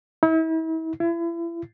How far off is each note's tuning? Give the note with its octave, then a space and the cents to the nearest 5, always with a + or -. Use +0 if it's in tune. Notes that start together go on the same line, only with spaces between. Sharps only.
E4 -40
E4 +35